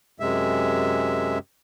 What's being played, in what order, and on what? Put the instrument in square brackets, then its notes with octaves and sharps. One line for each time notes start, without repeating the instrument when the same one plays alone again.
[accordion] F#2 C3 G#3 E5